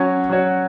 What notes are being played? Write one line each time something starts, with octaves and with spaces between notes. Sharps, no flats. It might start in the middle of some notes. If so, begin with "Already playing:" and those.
Already playing: F#3 C#4 F#4 C#5
F#3 C#4 F#4 C#5